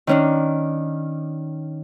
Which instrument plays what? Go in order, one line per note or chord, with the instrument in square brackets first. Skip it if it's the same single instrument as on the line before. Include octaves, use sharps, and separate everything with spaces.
[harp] D#3 C#4 D4